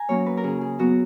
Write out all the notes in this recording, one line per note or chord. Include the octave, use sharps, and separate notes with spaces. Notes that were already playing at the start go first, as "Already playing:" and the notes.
Already playing: G#5 A#5
F#3 A#3 C#4 C#5
B4
A#4
C#3 G#4
G#4
F#3 B3 F#4